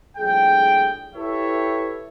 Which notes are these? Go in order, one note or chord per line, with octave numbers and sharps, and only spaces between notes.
A#1 A2 G3 G#4 G5
E4 G4 A4 B4 C#5 E5